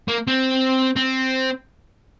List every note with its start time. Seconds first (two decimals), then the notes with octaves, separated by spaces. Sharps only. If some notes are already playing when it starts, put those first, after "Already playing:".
0.08 A#3
0.27 C4
0.96 C4